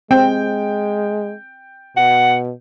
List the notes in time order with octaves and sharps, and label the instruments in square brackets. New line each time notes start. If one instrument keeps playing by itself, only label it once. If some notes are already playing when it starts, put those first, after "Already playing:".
[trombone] G#3 [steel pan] C4 [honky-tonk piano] G5
[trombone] B2 [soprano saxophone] F#5